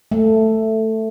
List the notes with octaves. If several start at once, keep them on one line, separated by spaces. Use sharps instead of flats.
A3